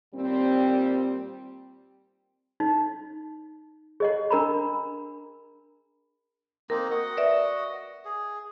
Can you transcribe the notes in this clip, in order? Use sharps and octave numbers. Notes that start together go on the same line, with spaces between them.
D#2 A#2 G3 C4
D#4
G#4 D#5 F#5
D4 A#4 A#5 B5
A#3 C4 D#4 A#4
F#4 D#5 F#5
B4 D5 E5
G#4